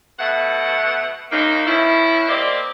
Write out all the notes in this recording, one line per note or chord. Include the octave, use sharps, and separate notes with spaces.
B2 A3 F#5
F#2 C#3 A#3 D#4
B2 C#4 E4
A#3 C4 G4 D5 D#5